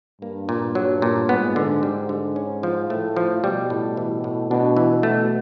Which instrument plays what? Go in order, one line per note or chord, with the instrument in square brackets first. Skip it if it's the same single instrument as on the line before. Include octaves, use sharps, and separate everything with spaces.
[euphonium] G2 [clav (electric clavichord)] A#3
[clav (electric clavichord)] A#2
F#3
A#2
[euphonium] G#2 [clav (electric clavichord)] B3
[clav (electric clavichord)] D3
G3
D3
C#4
F3
[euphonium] A2 [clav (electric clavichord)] A3
[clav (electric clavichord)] F3
[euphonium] B2 [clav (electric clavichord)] G3
[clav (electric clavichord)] A2
E3
A2
[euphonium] B2 [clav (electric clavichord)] D4
[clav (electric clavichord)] E3
[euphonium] B2 [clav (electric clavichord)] A3